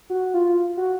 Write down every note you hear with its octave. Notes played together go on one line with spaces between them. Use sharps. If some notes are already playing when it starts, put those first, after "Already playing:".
F#4
F4
F#4